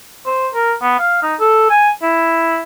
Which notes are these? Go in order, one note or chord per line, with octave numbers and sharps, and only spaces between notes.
C5
A#4
B3
F5
D#4
A4
G#5
E4